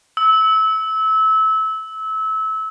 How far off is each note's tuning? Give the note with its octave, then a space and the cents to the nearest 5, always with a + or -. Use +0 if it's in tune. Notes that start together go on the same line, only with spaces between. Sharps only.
E6 -25